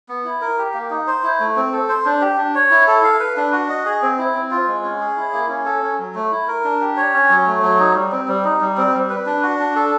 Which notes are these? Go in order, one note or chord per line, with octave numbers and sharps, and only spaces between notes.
B3
E4
A#4
G4
A#3
D#4
C5
E4
A3
C4
A4
C5
D4
G4
D4
C#5
E4
A4
F5
B4
D4
F#4
D#5
G#4
C4
E4
C4
F4
G#3
C#4
G#4
E4
A#3
C#4
A4
C#4
F#3
A3
E4
A#4
D4
G4
C#5
C#4
F#3
A3
F#3
D#4
G3
C4
G3
D#4
G3
C4
G3
B4
D4
F#4
D4
A4